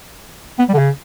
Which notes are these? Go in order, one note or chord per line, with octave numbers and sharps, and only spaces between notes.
B3
G3
D3
C#3